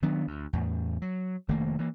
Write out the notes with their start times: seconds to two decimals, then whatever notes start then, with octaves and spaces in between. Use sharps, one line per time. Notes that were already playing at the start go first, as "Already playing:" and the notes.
0.02 D#3 F#3 B3 D4
0.27 D2
0.53 E2 A2
1.02 F#3
1.48 F1 D#3 A3 A#3
1.79 E3 A#3